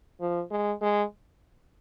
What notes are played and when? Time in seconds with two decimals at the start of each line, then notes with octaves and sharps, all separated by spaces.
0.21 F3
0.51 G#3
0.82 G#3